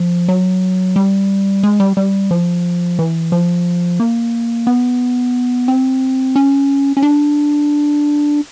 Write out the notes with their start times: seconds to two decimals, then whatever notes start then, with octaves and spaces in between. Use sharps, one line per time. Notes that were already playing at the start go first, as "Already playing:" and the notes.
Already playing: F3
0.28 F#3
0.96 G3
1.63 G#3
1.80 G3
1.97 G3
2.31 F3
2.99 E3
3.32 F3
4.00 A#3
4.67 B3
5.68 C4
6.36 C#4
6.97 C#4
7.02 D4